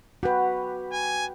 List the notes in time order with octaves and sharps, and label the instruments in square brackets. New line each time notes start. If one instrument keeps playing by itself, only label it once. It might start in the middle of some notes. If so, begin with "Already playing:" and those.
[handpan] F#4 B4 [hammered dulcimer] G4 F#5
[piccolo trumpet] G#5